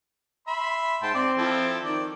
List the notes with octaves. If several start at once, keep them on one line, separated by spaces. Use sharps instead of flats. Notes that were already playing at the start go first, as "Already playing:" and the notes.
E5 B5 C6
G#2 G5 A5 C6
C4 D5
F3 E4 A4
D#3 D5